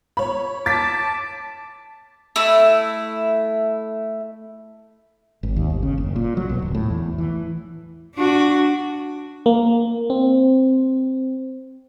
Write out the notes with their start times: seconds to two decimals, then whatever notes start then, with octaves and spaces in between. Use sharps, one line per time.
0.17 C#5 B5
0.66 A5 D6 A6 B6
2.36 A3 E4
5.43 G#1
5.56 D#2
5.70 G1
5.83 C#3
5.98 F#1
6.16 A#2
6.37 F#3
6.49 B1
6.62 D1
6.75 A2
6.90 E2
7.18 E3
8.15 D4 F#4
9.46 A#3
10.10 C4